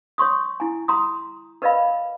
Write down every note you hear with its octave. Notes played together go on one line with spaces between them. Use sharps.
C#5 C6 C#6 D#6
E4 G#5
A#5 C6 D#6
A#4 B4 D5 D#5 F5 B5